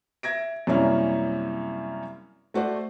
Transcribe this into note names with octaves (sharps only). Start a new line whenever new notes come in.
E5 G#6 A#6 D7
F#2 C3 G3 A#3 C#4 E4
A3 F#4 C5 D5